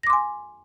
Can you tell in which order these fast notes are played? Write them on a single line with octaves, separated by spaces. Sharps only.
A#6 D6 C6 G#5